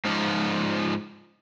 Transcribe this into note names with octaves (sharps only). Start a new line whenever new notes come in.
G#2 F3